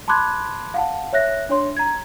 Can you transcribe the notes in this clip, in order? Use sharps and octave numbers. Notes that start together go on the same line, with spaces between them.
A5 B5 C6 D6 F#6 G#6
F5 F#5 A5
C#5 E5 F#6 A#6
D4 C#5 C6
A#5 G#6